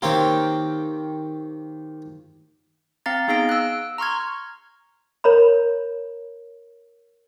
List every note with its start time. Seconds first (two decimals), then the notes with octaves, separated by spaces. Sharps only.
0.02 D#3 A#3 C4 G4 C#5
3.06 C4 F5 A#5 A6
3.28 B3 D#4 G#4 F5 A#6 D7
3.49 E6 F#6
3.98 A#5 C6 C#6 F6 G#6
5.24 A#4 C#5 A#5 B5